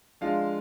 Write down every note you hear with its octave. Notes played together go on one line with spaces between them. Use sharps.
F3 G#3 D4 F4 F5